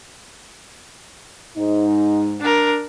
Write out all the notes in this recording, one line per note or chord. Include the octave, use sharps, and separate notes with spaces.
G#2 D#4
D4 A#4